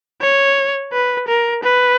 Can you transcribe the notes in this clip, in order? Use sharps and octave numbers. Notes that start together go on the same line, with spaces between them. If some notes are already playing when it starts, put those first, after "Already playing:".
C#5
B4
A#4
B4